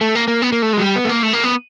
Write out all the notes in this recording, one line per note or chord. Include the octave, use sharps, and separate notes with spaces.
A3
A#3
A#3
B3
A#3
A3
F#3 G#3
G3
B3
A3
A#3
A3
A#3
B3